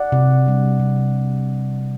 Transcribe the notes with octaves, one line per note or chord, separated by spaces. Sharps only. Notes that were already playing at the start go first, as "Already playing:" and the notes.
Already playing: D5 F#5
C3
G3 D4
C3